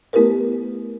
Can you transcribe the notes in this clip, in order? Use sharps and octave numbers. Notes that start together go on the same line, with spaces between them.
A3 B3 E4 G4 A#4 B4